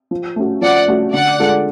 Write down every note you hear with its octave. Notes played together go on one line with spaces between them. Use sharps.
F3
A3 C#4 F#4
F3 D5 F#5
A3 C#4 F#4
D3 D5 F#5
G#3 D4 F4 A4